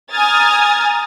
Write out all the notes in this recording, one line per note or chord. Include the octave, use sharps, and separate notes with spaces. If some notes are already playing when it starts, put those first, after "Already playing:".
G#5 A#5 D#6 F6 G#6 A6